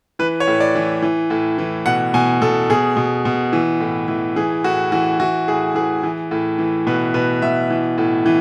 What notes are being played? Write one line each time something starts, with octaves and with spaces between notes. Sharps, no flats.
E3 B4
C#5
A2
D5
E3
E3
A2
E3
B2 F#5
B2 G#5
B2 A4
B2 G#4
B2
B2
E3
A2
E3
E3 G#4
A2 F#4
E3 F#4
E3 F#4
A2 G#4
E3 G#4
E3
A2
E3
B2 B4
B2 B4
B2 E5
E3
A2
E3